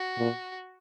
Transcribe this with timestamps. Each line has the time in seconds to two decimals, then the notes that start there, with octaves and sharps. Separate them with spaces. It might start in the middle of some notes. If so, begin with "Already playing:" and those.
Already playing: F#4
0.18 A#2